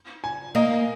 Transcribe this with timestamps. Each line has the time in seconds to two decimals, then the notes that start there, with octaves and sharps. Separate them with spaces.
0.24 G#5
0.55 A#3 D#5